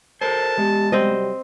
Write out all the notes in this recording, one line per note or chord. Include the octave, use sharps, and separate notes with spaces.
A4 A#4 C5 A5
G#3 B3 G4
C3 F#3 G3 C4 C5 D#5